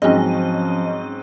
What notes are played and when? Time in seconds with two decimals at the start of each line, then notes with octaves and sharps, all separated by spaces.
0.02 G#2 F3 F#3 C4 C#4 D#5